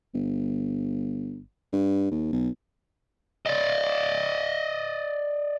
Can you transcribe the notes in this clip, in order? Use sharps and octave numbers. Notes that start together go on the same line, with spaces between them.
G1
G2
D#2
B1
D5 D#5